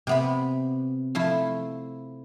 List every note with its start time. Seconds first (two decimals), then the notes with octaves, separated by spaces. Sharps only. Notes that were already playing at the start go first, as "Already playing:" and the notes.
0.07 C3 B3 B5
1.15 F3 A3 E4